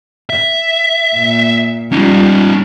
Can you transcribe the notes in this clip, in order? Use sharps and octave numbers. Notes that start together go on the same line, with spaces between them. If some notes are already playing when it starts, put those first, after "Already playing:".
E5
A#2
G3 C#4 D#4 F4